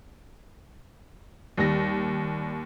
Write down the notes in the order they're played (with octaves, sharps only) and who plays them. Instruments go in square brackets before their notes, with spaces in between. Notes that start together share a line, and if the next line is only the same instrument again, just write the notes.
[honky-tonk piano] D#2 [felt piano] G3 A#6